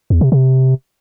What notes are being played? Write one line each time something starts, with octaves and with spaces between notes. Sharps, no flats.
E2
C3
C3